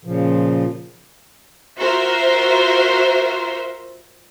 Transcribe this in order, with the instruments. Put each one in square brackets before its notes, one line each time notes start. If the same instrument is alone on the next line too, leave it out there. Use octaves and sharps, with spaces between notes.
[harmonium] A#2 C#3 F3
[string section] F4 F#4 A#4 C5 E5